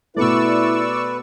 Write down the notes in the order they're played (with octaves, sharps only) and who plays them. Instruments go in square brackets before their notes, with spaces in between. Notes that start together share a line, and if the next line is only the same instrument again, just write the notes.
[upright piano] B2 A3 [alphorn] E4 [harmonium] B4 [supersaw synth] D5 C#6 E6